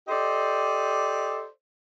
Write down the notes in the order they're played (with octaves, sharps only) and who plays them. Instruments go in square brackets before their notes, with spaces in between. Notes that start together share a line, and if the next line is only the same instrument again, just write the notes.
[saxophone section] G4 A4 C5 D5 D#5